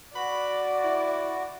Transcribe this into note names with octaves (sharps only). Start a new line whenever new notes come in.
F#4 D5 B5
E4